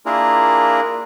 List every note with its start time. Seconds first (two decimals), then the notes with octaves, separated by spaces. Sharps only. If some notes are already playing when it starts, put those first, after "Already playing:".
0.06 A#3 D4 E4 F4 G#4 A#4